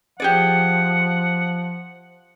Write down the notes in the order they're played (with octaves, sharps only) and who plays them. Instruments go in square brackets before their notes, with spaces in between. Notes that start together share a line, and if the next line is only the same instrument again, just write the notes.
[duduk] F3 [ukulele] G4 G#4 D5 [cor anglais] F#5